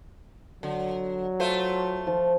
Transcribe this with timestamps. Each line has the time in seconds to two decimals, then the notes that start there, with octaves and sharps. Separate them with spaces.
0.63 D3 F#3
1.40 A3 F4 C5
2.07 F3